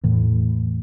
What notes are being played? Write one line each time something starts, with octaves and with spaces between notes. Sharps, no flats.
E2 A2 E3